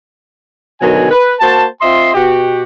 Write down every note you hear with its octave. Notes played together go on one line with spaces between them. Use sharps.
B2 D3 D#3 F#3 G#5
B4
A#3 F#4 C5 A5
C4 F4 D#5 E5 C6
B2 F#4 G4